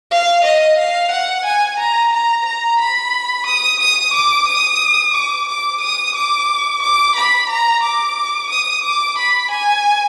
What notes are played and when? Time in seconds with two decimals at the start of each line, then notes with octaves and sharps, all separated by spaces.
0.11 F5
0.44 D#5
0.78 F5
1.12 F#5
1.45 G#5
1.79 A#5
2.12 A#5
2.46 A#5
2.79 B5
3.47 D#6
3.80 D#6
4.13 D6
4.47 D#6
5.14 D6
5.48 D6
5.81 D#6
6.15 D6
6.82 D6
7.16 B5
7.49 A#5
7.83 D6
8.50 D#6
8.83 D6
9.18 B5
9.51 G#5